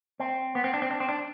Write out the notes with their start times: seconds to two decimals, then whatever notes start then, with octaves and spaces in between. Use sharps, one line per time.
0.20 C4
0.55 B3
0.64 C4
0.74 D4
0.82 C4
0.91 D4
1.00 C4
1.09 D4